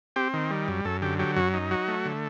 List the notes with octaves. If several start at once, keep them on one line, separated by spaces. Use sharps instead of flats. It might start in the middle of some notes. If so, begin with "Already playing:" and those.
C4 G4
D#3
G3
F#2
F#2 A4
D3 G4
F#3 G4
F#2 F#4
D#4
F#3 F#4
A3
D3